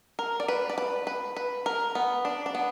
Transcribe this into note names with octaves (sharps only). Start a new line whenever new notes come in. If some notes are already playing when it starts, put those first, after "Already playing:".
A#4
D5
B4
D5
B4
B4
B4
A#4
B3
D4
D4
B3